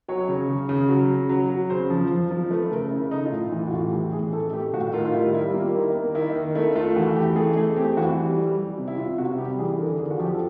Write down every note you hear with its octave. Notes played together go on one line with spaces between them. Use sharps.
F#3 C#5
C#3
C#3
C#3
F#3
C#3
F#3
F#3
C#3 C5
F3
F3
F3
A3 B4
C#3 A#4
C#3 E4
A3 D#4
F4
A2 E4
E3
F4
F#4
A2 F4
G4
E3
A2 G#4
A3 A4
A3 G4
A2 F#4
D#3 F4
F4
G3 E4
G3 E4
A#3 F4
D#3 E4
A#3
D#3 E4
D#3
A3 E4
A3 F4
E3 F#4
E3 G4
A3 G#4
A3 G#4
C4 G4
E3 F#4
G3
G3
G3
C3
E4
C3 F4
C3 F#4
G3 G4
E3 G#4
D3 A#4
D3 G#4
F#4
F3 G4
A4